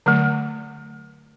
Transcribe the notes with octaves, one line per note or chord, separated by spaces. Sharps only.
D3 F#3 A3